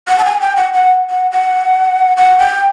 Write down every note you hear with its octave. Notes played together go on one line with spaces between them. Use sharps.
F#5
A5
G#5
G5
F#5
F#5
F#5
F#5
F#5
G5